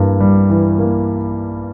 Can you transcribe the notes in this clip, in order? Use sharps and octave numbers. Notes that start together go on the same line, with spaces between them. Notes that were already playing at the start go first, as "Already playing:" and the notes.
Already playing: G2 E3 A#3
G3
E3
A#3